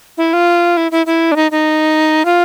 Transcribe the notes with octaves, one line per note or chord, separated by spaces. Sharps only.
E4
F4
E4
E4
E4
D4
D#4
D#4
F4